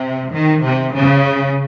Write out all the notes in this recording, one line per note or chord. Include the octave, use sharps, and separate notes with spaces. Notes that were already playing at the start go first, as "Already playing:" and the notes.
Already playing: C3
D#3
C3
C#3